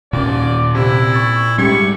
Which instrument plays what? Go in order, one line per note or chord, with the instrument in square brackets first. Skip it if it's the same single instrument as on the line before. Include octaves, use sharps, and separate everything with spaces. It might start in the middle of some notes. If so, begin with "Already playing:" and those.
[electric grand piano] D#2 [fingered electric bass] A#2 C#4 [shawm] D5
[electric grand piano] C3 [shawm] E4
[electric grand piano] C#6 A6
[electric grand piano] G#2 G4 G#6 [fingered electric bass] G3 C#4 [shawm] C#6